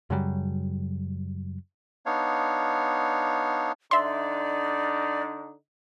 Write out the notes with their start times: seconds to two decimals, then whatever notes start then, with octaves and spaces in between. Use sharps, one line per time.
0.10 F#2 C#3 F#3 G3
2.06 B3 D4 D#4 C#5 F5
3.91 D3 D4 D#4 D5 E5 C6